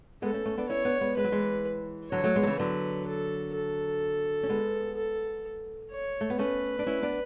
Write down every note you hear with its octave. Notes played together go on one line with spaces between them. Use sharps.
G#3 B3 A4
A3 C#4
A3 C#4
B3 D4
C#4 E4 C#5
B3 D4
G#3 B3
G#3 B4
F#3
E3 G#3
D3 F#3 C#5
F#3 A3
G#3 B3
F#3
C#3 E3
D3 F#3 B4
A4
A4
C#4
G#3 B3
A4
C#5
A3
B3
A3 C#4 B4
D4
C#4 E4
B3 D4